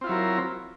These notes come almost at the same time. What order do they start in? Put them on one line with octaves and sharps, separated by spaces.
C4 F4 E4 F#3 A#4